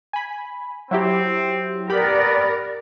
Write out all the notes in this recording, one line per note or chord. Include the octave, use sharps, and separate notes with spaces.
G#5 B5
F#3 C4 E4 G4
B3 G4 A#4 D5 B5